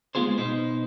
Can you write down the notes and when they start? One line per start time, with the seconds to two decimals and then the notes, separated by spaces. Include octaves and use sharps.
0.15 G#3 A#3 B3 F4 G#4 C5
0.38 B2 D#4 B4 C5